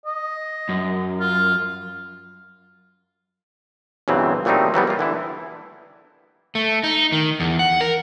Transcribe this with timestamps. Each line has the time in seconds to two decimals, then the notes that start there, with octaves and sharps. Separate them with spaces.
0.05 D#5
0.69 F#2
1.20 F4
4.08 B1 G2 C#3 E3 F#3 C4
4.45 A#2 F#3 G3 A3 C4 D#4
4.74 E3 F#3 G3 B3
4.87 A#3 F4
4.99 D3 E3 E4
6.55 A3
6.84 D#4
7.12 D#3
7.40 E2
7.59 F#5
7.81 A#4